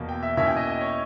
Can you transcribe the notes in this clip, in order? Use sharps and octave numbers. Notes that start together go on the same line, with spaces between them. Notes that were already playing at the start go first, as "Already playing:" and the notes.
Already playing: E2 B2 A#3
G5
E5
B2 A#3 C#4 E4 E5
G5
D#5
D#5
C#5